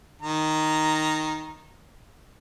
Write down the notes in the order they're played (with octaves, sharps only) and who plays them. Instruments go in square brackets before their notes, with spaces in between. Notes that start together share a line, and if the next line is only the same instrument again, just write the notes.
[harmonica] D#3 A#5